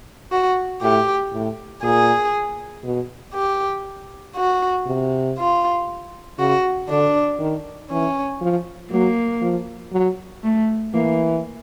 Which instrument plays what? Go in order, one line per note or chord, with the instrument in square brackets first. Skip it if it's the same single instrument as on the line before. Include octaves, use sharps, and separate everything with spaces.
[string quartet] F#4
[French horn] A2 [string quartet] G4
[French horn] A2
[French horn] A#2 [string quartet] G#4
[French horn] B2
[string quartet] G4
F#4
[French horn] C3
[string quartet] F4
[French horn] C#3 [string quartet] F#4
[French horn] D3 [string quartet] D4
[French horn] D#3
[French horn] E3 [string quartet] C#4
[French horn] F3
[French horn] F#3 [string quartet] A#3
[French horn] F3
F#3
[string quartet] A3
[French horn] E3 [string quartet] A#3